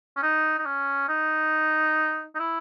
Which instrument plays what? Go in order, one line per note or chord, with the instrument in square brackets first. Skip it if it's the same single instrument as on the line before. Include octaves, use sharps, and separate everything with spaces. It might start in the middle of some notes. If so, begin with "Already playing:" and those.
[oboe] C#4
D#4
D#4
C#4
D#4
D#4
E4